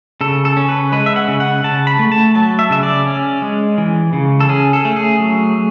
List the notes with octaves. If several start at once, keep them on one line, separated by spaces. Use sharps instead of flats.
C#3 A4
A4
C#4
B4
G#3 B4
E5
F#5
C#3
F#5
C#3 A5
B5
A3
A5
F#3 A5
E5
C#3 E5
D5
C#4
G#3
E3
C#3
A4
C#4 G#4
A4
A3
G#4
F#3